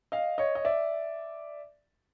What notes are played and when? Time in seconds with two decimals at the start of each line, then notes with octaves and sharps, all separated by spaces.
0.12 D#5 F5
0.38 C#5 D#5
0.55 D#5
0.65 D5 E5